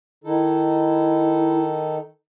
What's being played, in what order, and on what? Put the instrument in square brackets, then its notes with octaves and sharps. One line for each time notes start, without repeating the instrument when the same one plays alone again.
[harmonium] D#3 D#4 A4 [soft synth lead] E4